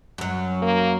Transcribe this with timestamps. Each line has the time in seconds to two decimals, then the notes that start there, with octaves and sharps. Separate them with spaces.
0.18 F#2 F#3
0.62 A#3